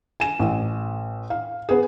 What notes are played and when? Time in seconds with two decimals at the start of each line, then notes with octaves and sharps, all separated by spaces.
0.20 G#5 E7
0.39 A1
1.30 F5
1.69 B3 G#4